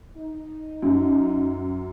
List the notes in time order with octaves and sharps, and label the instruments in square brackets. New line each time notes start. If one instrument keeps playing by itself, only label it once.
[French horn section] D#4
[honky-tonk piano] F#2